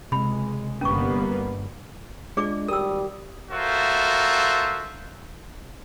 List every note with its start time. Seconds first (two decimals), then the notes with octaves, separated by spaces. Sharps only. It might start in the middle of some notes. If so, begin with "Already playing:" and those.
0.12 C#2 C3 G#3 B5
0.81 G1 G3 A#3 B3 C#4 C#6
2.37 G#3 D4 F4 G#4 D5 D6
2.68 G#1 G3 G4 A#4 D#6 E6
3.51 F4 F#4 A4 A#4 C5 E5